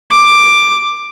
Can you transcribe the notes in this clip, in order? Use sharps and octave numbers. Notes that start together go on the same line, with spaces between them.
D6